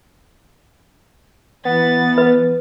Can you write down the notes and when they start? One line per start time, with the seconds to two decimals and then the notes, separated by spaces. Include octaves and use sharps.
1.65 E3 B3 A6
2.18 B4